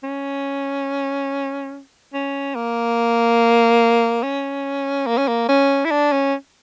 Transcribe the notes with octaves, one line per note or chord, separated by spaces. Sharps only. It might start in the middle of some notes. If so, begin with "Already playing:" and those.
C#4
C#4
A#3
C#4
A#3
C#4
A#3
C#4
E4
D4
C#4